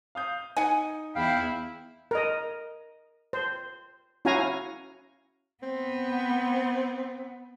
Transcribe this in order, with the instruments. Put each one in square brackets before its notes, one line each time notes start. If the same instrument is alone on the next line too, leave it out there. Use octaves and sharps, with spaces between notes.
[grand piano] F5 D#6 G6
[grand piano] D#4 [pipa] F#5 G#5
[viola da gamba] E2 E4 [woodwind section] F5 G5 B5
[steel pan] A#4 D#5
C5
C#4 E4 F#4 F5 G#5 A#5
[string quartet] B3 [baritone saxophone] C4